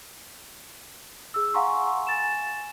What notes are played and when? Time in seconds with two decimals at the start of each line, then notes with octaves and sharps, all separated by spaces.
1.34 G#4 E6
1.54 F5 F#5 G#5 A#5 C6 C#6
2.07 G#5 A6 E7